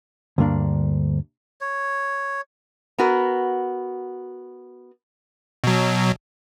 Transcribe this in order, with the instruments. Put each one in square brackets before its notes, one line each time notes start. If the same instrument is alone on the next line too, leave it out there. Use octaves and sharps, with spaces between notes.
[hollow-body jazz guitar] D2 G2 A#3 D4 A#4
[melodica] C#5
[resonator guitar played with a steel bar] B3 F#4 A#4
[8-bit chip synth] B2 F#3